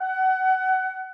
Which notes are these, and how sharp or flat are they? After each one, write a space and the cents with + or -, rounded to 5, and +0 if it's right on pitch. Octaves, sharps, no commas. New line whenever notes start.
F#5 +25